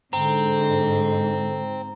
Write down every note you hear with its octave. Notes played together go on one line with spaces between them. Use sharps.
G#2 D3 C4 A#5